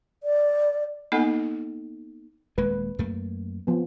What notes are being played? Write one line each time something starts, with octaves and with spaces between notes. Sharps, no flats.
D5
A#3 B3 D#4 A4 D#5 G#5
D#1 G#3 A#3 B4
F#2 A3 A#3
F3 B3